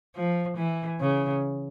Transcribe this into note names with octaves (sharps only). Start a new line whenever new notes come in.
F3
E3
C#3